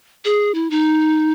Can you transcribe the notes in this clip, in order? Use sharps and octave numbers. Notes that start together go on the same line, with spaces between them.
G#4
E4
D#4